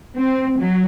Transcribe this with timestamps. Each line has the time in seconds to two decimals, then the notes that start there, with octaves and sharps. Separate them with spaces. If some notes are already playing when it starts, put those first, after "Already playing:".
0.17 C4
0.56 F#3